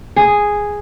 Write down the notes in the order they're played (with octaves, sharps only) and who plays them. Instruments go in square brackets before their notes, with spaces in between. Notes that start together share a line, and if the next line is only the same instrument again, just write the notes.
[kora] G#4